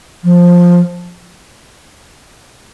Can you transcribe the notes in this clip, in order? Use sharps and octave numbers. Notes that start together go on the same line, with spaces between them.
F3